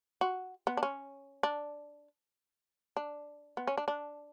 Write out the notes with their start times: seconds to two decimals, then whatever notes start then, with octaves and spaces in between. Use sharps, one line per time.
0.21 F#4
0.67 B3
0.77 D4
0.83 C#4
1.43 D4
2.96 D4
3.57 B3
3.67 C#4
3.77 D4
3.88 D4